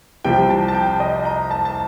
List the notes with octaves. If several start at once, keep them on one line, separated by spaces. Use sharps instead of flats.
C2 C3 F3 G5
A5
A5
G5
D#5
A#5
A5
A5